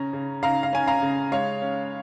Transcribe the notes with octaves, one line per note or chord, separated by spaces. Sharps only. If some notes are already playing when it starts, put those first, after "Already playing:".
Already playing: C#3 C#4 A#5
C#3
C#3 F5 A#5
F5
C#4 G#5
F5 A#5
C#3
G#3 C#5 F5
C#4